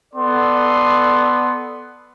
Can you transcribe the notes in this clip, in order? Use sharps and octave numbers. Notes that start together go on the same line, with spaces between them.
B3 A4 D5 C6